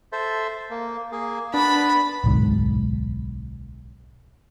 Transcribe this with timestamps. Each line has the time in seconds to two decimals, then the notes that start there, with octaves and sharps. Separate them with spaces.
0.12 A4 C5 E5
0.70 A#3
1.12 A#3 G#4
1.54 B3 D4 A5 B5
2.24 D1 B1 G#2